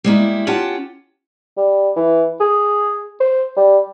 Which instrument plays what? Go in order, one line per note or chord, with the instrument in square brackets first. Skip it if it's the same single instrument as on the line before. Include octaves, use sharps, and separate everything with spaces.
[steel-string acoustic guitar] G3 G#3 A#3 E4
C#4 F4 G4 F#5 A5
[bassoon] G3
E3
G#4
C5
G3